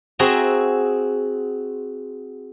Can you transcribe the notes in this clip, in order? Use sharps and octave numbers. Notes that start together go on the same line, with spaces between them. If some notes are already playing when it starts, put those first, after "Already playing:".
C4 F#4 G#4 E5 A#5